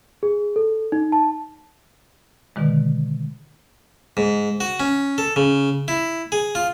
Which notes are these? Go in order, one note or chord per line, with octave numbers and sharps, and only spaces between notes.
G#4
A4
D#4
A5
B2 D3 D#3 G#3
G#2
F#4
C#4
A4
C#3
E4
G#4
F4